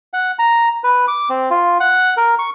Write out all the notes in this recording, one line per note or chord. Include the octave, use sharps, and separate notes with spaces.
F#5
A#5
B4
D6
C4
F4
F#5
A#4
C#6